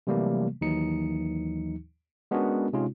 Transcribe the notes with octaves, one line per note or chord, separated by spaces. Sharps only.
C3 E3 F#3 G3 A3 A#3
D#2 E3 F#3 D#4 C#7
G#3 B3 C#4 D4 F#4 A#4
C3 G#3 C#4 D#4 F4